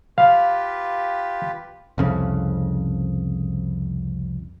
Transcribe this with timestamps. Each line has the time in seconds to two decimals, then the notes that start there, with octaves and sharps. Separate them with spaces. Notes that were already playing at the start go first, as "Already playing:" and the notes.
0.18 F4 G4 B4 F5
1.98 C2 F2 C#3